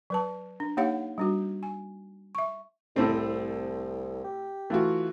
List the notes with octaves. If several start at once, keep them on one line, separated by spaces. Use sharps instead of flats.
F#3 B4 A5
D4
A#3 D#4 G4 C#5 F5 F#5
G3 D4 F#4
G#5
E5 C#6
C2 A2 A3 C4
G4
E3 A3 F4 F#4